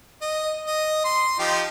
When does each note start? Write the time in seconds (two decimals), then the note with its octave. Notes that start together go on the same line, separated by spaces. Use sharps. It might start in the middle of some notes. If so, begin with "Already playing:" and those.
0.21 D#5
0.67 D#5
1.05 C6
1.39 F3 D#4 G4